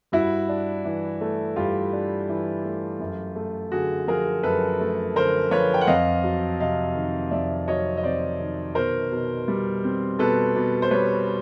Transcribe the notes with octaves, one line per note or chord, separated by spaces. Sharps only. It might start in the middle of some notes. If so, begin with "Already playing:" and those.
G2 E4 F#4
D4
E3
A3
G2 F4 G4
D4
E3
A3
F#2
A3
D3 F#4 G#4
F3 G#4 A#4
F#2 A4 B4
A3
D3 A#4 C5
F3 B4 C#5
G5
F#5
F2 D#5 F5
F#3
C3 D#5 F5
D#3
F2 D5 E5
F#3 C#5 D#5
D#5
C3 C5 D5
D#3
B2 A#4 C5
B2
G3
C4
B2 A4 B4
B2
C5
G3 B4 C#5